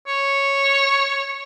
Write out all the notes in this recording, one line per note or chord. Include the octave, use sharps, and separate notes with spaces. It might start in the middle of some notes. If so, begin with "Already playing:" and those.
C#5